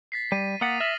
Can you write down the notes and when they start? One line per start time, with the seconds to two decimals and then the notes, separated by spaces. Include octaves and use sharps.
0.12 A6 B6 C7
0.32 G3 D#7
0.61 A#3 F#5 D#6 A6 B6
0.80 E5 F6 A#6 F#7